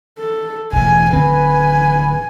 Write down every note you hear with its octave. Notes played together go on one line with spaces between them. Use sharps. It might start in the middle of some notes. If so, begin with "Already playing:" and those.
A4
E1 A2 G#5
D1 D3 C4 B4 G#5